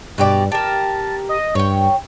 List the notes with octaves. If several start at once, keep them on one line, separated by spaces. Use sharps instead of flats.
G2 B2 G4 D5
G4 A#4 A5
D#5
G2 C#5 G5